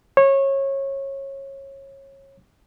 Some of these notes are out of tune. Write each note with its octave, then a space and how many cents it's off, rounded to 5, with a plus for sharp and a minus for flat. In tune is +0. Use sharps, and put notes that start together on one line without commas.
C#5 -20